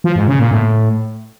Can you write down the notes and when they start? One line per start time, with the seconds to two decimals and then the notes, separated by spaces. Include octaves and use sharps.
0.04 F3
0.16 G#2
0.28 C#3
0.39 A#2
0.51 A2